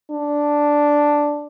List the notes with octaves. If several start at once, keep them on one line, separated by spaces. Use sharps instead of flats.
D4